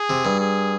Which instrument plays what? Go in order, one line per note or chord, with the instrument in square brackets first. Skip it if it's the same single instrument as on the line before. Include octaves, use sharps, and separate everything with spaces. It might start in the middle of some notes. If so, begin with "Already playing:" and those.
Already playing: [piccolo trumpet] G#4
[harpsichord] C3
G2
[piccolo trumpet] G#4